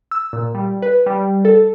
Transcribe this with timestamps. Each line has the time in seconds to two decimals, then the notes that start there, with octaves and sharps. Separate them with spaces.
0.11 E6
0.33 A#2
0.55 G3
0.82 B4
1.06 G3
1.45 A4